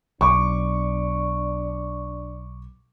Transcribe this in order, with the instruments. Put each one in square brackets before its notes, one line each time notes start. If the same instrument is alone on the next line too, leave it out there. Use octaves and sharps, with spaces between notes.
[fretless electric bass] B1 [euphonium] D4 [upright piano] C#6 D6